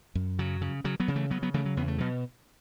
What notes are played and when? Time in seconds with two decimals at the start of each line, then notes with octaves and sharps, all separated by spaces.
0.15 F#2
0.39 C#3 F#3
0.61 C#3
0.84 C#3 F#3
1.00 F#3 B3
1.08 C#3
1.15 E3 A3
1.30 C#3 F#3 B3
1.42 F#3 B3
1.54 C#3 E3 A3
1.65 F#3
1.77 E2 B3
1.88 A3
1.98 B2 F#3